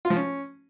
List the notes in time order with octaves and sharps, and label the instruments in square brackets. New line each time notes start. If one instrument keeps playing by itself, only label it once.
[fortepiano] F4
F3
C#4